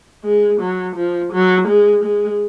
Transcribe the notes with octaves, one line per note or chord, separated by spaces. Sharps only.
G#3
F#3
F3
F#3
G#3
G#3